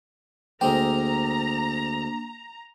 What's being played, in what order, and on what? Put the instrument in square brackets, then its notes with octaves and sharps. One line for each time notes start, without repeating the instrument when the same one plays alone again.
[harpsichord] D2 G#3 C5 [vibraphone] A#3 D4 [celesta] G5 [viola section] A#5